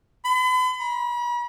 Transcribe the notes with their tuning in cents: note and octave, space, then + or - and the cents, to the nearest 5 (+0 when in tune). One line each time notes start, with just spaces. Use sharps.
B5 +40
B5 -45